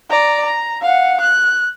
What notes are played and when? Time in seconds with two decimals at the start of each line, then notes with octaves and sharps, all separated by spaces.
0.10 D5 A#5
0.45 A#5
0.82 F5 F#5
1.21 F#6